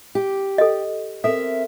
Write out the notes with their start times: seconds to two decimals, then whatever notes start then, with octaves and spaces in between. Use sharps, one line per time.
0.15 G4
0.58 A4 D#5
1.24 C4 A4 A#4 E5